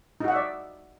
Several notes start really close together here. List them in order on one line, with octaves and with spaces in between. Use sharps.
D#4 F#4 F#5 E5 D5